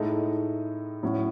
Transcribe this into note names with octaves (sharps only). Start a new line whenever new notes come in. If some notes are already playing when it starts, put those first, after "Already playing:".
Already playing: A2 G#3 D#4 A4
A2 F#3 C#4